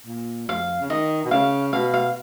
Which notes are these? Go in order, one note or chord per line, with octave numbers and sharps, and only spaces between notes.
A#2
F2 F5
C#3
D#3 D#5
B2
C#3 F5
B2 F5
F5